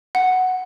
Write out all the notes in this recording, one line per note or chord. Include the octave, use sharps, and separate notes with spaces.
F#5